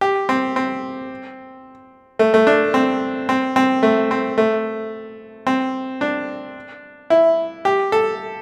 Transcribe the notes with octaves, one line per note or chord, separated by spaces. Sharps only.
G4
C4
C4
A3
A3
D4
C4
C4
C4
A3
C4
A3
C4
D4
E4
G4
A4